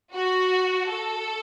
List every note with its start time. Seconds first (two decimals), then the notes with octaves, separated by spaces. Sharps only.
0.14 F#4
0.90 A4